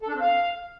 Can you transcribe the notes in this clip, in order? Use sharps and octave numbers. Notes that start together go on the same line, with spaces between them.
A4
D4
C4
F5